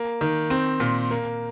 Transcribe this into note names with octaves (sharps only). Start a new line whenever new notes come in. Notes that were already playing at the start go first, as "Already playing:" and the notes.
Already playing: A#3
D#3
C4
A#2
A#3